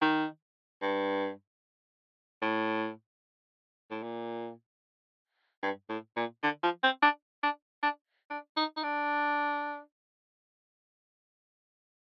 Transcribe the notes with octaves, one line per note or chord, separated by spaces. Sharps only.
D#3
G2
A2
A2
A#2
G2
A2
A#2
D3
F3
C4
D4
D4
D4
D4
D#4
D#4
D4